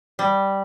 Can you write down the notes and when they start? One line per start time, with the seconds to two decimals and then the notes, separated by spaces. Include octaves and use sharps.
0.19 G3